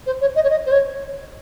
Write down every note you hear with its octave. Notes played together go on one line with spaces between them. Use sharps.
C5
C#5
D#5
C#5
D#5
C5
C#5